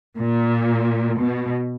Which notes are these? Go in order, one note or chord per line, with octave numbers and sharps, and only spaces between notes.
A#2
B2